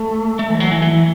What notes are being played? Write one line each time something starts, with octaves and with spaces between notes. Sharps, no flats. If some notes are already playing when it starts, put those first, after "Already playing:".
Already playing: A3
A3
E3
F#3
E3
E3